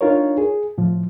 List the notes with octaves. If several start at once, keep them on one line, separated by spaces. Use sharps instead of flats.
D4 D#4 F4 A#4 C#5
G#4
A2 F3